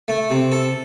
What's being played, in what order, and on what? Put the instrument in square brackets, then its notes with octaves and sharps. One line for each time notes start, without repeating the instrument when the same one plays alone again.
[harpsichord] A3
C3
A4